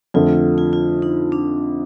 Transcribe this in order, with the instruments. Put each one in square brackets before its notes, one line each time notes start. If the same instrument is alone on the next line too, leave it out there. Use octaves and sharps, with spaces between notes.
[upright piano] F2 D3 A3 [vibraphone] F4
[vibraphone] F4
F4
F4
D#4
D4